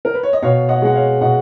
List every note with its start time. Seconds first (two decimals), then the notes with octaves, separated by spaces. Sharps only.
0.05 A#4
0.14 B4
0.23 C#5
0.33 D#5
0.42 B2 C#5 F5
0.69 D#5 F#5
0.82 G#3 F#5
0.95 C#5 F5
1.21 B2 D#5 F#5